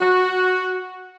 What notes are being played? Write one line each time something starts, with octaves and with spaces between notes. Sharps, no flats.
F#4